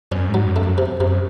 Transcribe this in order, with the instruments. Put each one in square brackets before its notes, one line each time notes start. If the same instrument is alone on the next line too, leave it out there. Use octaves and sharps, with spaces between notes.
[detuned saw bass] F#2 [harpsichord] C#4
[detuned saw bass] G#2
[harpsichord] F#3
[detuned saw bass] F#2
[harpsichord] A3
[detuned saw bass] F#2
[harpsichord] C3
[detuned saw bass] F#2 [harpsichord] C3